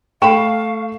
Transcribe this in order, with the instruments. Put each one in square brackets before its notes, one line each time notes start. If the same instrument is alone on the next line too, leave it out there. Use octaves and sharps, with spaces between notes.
[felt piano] A3 C#6 E7 [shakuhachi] F5 [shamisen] G5 B5